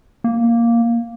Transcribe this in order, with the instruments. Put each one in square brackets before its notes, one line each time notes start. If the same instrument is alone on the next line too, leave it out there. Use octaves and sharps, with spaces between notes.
[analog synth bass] A#3